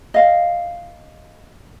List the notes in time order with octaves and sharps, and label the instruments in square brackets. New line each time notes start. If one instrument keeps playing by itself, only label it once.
[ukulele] D#5 F5